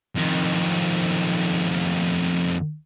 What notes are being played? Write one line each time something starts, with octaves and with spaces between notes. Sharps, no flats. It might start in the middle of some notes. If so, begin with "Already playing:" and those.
F2 D#3